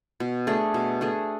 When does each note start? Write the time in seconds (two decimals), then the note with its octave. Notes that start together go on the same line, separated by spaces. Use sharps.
0.20 B2
0.47 A3 D4 G#4
0.74 B2
1.01 A3 D4 G#4